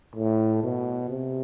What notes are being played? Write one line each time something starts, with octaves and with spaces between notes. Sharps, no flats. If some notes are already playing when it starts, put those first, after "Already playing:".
A2
B2
C3